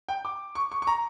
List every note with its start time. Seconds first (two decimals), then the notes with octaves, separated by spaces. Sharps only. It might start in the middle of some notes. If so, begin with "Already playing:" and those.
0.08 G5
0.25 D6
0.55 C#6
0.72 C#6
0.82 C#6
0.87 A#5